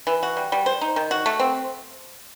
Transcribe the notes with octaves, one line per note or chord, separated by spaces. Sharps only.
E3
F#4
G3
G3
C5
D#4
D#3
F#4
A3
C4